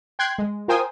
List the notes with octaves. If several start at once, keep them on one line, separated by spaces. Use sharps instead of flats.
G5 C6 F#6 G#6
G#3
F4 A#4 C5 G5 G#5 D#6